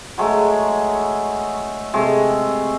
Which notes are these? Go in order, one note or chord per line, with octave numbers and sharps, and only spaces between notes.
F#3 G#3 A3
C3 G#3 A3